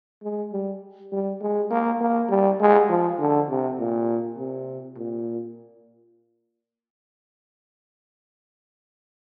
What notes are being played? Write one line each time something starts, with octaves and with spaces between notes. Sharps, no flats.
G#3
G3
G3
G#3
A#3
A#3
G3
G#3
F3
D3
C3
A#2
C3
A#2